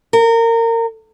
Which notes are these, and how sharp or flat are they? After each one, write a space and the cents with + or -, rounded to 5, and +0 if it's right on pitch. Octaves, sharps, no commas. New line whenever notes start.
A#4 -25